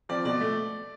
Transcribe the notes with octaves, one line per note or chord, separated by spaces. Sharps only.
F3 C4 D5
B2 D5
A3